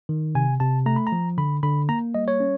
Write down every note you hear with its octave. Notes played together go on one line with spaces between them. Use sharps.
D#3
C3 G#5
C3 A5
A3 A#5
B5
A#5
F3
D3 B5
D3 B5
A#3 A#5
G3 D#5
C#5
C#4